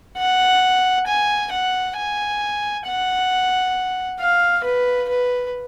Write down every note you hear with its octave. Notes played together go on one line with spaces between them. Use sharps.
F#5
G#5
F#5
G#5
F#5
F5
B4
B4